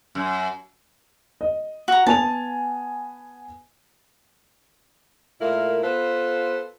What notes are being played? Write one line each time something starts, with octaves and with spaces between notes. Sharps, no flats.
F#2
D#5
F#4 A#5
B3 G#5 A5 F7
A#2 A3 E4 A#4 F5
B3 F4 A4 B4 C5